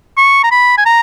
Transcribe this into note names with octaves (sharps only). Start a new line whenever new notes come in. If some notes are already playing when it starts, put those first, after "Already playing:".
C#6
A#5
B5
G#5
A#5